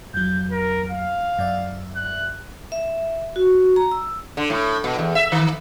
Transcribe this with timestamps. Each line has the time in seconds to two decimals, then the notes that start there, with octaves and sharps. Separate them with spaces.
0.14 F2 F#3 G6
0.51 A#4
0.90 F5
1.39 F#2 D5 E5
1.96 F#6
2.72 E5
3.36 F#4
3.76 A#5
3.91 E6
4.37 D3
4.50 A2
4.84 B2
4.99 E2
5.15 E5
5.32 D#3